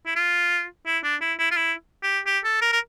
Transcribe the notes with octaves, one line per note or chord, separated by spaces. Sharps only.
E4
F4
E4
D4
E4
E4
F4
E4
G4
G4
A4
A#4
A#4